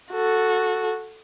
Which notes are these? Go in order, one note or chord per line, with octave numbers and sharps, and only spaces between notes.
F#4 A4